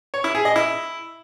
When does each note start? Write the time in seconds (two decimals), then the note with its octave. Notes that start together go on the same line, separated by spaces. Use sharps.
0.14 C#5
0.24 E4
0.35 G#4
0.45 D#5
0.56 E4